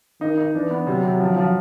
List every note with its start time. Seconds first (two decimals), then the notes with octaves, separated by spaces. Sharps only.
0.21 D#3 D#4
0.38 D#4
0.54 E3 D4
0.71 B3
0.87 C3 F#3
1.03 C3
1.20 F3
1.36 F3